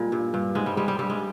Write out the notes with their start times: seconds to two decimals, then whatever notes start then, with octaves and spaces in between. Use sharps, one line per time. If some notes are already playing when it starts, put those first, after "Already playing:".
Already playing: A#2 G3 G#3
0.12 G2
0.34 G2
0.55 G#2 G#3
0.66 G3
0.77 G3 G#3
0.88 G3
0.99 G2 G3
1.10 G#3